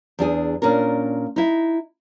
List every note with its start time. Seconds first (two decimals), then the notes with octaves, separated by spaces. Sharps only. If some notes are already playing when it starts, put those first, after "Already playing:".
0.19 E2 D4 G#4
0.62 A#2 C#4 D4 A#4
1.36 D#4 E4